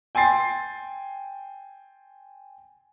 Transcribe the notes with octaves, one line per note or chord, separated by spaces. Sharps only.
G5 G#5 C6 A6 C7